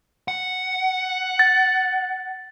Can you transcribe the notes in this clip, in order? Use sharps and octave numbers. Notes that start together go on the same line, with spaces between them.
F#5
A6